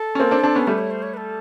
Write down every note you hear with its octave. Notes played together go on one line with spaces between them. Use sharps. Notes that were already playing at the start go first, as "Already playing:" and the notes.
Already playing: A4
C#4
A#3 C4
C4 D4
C4 D4
B3 C#4
G3 A3 B4
C#5
C5
C#5
B4
A4